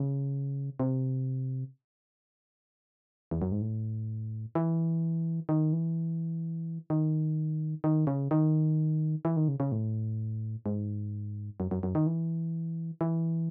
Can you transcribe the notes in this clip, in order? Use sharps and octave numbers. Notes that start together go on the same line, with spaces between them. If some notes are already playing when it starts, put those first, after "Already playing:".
Already playing: C#3
C3
E2
F#2
G#2
A2
E3
D#3
E3
D#3
D#3
C#3
D#3
E3
D#3
C#3
C#3
A2
G#2
F#2
F#2
F#2
D#3
E3
E3